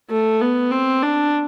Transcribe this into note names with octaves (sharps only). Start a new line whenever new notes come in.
A3
B3
C4
D4